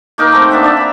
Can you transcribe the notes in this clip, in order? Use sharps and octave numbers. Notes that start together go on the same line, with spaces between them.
A#3 D#4 A#4
A3 C4
A#3 D4 E5 F#5
D4 D5 E5
A#5 B5